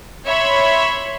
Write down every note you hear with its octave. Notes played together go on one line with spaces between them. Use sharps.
C#5 E5 B5 C6